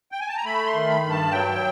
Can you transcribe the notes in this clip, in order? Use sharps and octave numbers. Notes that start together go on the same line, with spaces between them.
G5
G#5
A5
A#5
A3 B5
C6
D#3
B5
G2
A5
F#3 G5